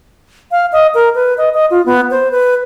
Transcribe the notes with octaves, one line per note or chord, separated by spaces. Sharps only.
F5
D#5
A#4
B4
D#5
D#5
F4
B3
C5
B4